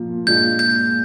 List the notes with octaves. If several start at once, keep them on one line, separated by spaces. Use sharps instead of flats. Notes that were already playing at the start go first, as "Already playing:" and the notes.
Already playing: A#2 F3 A#3
A#2 G#3 D4 F4 G6
G6